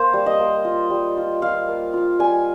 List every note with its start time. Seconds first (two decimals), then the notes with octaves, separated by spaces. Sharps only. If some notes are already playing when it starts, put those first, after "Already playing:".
Already playing: A#3 C5
0.13 G3
0.26 D#5
0.40 A#3
0.65 F4
0.90 G3
1.17 F4
1.42 F4 F5
1.68 A#3
1.94 F4
2.19 G3 G#5